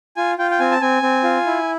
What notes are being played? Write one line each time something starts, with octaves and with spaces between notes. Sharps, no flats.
F4 G#5
F4 G5
G5
C4 G#5
A5
C4 G#5
C4
F4
E4